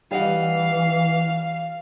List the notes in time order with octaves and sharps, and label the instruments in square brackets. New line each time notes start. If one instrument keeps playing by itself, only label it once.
[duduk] E3 [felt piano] G3 D#5 F#5 [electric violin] F5